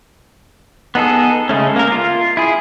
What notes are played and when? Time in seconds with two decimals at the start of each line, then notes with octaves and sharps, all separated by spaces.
0.95 B3 D#4 G#4 A4
1.49 C#3 G#3 A3 C#4
1.76 A#3 A#4
1.92 F4
2.37 E4 G#4